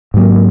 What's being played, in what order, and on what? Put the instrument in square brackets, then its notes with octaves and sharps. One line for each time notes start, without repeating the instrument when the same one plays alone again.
[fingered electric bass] G#2 F#3 A#3